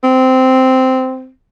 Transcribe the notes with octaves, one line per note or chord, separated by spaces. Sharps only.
C4